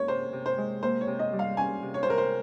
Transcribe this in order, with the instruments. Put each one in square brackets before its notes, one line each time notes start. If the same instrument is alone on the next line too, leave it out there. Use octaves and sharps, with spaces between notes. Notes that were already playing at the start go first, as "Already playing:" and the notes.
Already playing: [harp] A#3 C#4 [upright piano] C#5
[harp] C3 [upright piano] C5
[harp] C3
[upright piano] C5
[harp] G#3
[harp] A#3 [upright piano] C5
[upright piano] C#5
[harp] C3
[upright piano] D#5
[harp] G3
[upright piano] F5
[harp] C#4 [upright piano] G#5
[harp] C3
[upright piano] C#5
C5
[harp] C3 [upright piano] A#4
[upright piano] C5